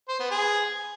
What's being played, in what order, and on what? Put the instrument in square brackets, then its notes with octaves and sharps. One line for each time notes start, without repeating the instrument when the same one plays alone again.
[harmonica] C5
B3
G#4